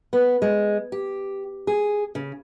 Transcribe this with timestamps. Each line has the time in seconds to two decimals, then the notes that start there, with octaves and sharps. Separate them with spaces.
0.13 B3
0.42 G#3
0.92 G4
1.67 G#4
2.15 C#3